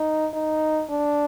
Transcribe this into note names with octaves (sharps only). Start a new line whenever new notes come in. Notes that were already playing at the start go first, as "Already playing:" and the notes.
Already playing: D#4
D#4
D4